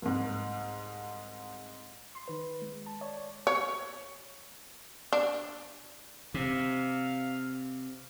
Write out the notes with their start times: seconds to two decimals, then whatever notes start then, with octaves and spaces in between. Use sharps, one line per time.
0.02 C2 G#2
2.15 C6
2.28 D#3 B4
2.62 G#3
2.86 A5
3.01 C#5 D5 A5
3.47 C#5
5.13 D4
6.34 C3 F5